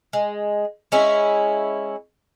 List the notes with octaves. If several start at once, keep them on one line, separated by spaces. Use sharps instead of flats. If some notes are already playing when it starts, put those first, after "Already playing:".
G#3
G#3 C#4 E4